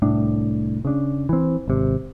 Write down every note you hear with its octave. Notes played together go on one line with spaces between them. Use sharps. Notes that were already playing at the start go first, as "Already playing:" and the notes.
C2 A2 D4
C#3 D4
E3 C4
G#1 C3